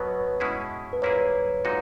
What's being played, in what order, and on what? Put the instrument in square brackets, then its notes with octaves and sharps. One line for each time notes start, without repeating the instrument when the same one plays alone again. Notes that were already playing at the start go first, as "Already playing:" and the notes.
Already playing: [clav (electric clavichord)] B2 F#3 B3 [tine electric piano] B4 C#5
[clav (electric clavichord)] B2 G#3 C#4 E4 G#4
[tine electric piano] B4
[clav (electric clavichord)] A#2 A#3 E4 G#4 [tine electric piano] C#5
[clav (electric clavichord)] A#2 G#3 D#4 F#4